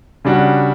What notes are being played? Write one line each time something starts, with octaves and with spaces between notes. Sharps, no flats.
C#3 G3 D4 F#4